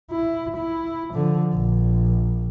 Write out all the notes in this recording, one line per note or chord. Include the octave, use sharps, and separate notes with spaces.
E4
E4
D3 F3
A#1